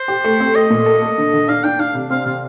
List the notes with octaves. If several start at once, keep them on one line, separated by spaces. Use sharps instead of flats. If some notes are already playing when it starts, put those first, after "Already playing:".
Already playing: C5
G4
A3
C4
A3 D#5
A#2
A4
A3
D3
D3
D4 F5
D4 G5
D4 F5
C3
C4 F5
C3 F5